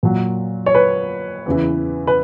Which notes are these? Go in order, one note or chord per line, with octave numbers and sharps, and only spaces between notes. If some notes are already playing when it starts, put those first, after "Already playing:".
A#2 F#3
C#5
B4
E2 C#3 E3
B4